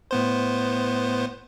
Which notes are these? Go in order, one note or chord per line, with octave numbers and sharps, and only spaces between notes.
A2 B3 C5